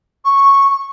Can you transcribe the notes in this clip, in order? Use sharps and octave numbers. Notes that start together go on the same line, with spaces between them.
C#6